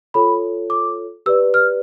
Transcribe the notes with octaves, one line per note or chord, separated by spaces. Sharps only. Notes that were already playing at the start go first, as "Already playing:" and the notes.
F4 A4 C#5 B5
D6
G4 B4 D5 E6
F6